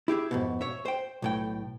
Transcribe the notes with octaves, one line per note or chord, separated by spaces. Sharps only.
E4 G4 G#4 E5
F2 G#2 B2
C#5 E5
C5 G5
B1 A2 G5